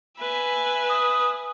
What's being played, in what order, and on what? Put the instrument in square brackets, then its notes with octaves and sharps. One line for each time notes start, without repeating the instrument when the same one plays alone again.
[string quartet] B4 E5 G#5
[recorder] D#6